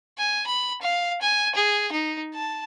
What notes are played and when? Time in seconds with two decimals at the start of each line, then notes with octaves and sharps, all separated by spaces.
0.18 G#5
0.47 B5
0.82 F5
1.22 G#5
1.55 G#4
1.92 D#4
2.34 A5